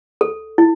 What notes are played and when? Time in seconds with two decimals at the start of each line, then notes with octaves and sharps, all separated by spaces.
0.21 A4
0.58 E4